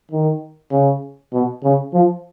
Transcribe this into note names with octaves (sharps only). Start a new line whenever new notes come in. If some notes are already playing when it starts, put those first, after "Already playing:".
D#3
C#3
B2
C#3
F3